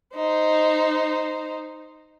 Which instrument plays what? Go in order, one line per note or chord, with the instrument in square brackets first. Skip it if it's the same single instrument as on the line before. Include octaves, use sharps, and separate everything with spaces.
[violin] D#4 C5